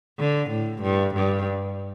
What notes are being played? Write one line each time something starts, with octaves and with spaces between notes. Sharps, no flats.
D3
A2
G2
G2